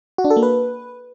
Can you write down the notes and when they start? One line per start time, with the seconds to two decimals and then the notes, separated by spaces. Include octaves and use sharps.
0.18 F#4
0.24 D4
0.30 A4
0.37 A#3
0.43 B4